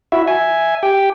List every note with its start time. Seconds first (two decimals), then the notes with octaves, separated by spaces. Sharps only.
0.12 E4 F#4 E5
0.28 E5 G#5
0.83 G4 G5